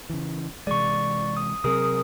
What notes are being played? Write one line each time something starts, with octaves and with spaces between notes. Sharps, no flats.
C#3 E3
C3 E3 G#3 D5 C#6
D#6
C3 F#3 C4 G#4 A#4 D#6